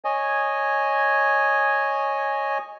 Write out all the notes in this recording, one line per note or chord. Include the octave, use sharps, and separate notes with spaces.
C#5 D#5 G#5